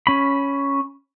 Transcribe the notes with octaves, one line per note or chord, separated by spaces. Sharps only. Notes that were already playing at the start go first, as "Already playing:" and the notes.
C#4 B5